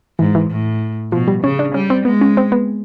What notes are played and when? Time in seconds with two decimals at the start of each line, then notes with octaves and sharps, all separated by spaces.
0.19 G#2 E3
0.35 E3
0.50 A2
1.12 B2 F3
1.28 G3
1.43 C#3 C#4
1.59 D4
1.74 G3 C#4
1.90 C4
2.05 G#3 B3
2.21 C#4
2.37 C4
2.52 B3